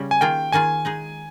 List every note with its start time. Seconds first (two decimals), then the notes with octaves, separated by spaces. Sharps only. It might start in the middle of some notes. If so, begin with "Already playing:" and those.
Already playing: C#3 G3 C#4
0.11 G#5
0.21 D#3 A#3 F4 G#4 G5
0.52 D#3 A#3 F4 G#4 G#5
0.85 G#3 D#4 G#4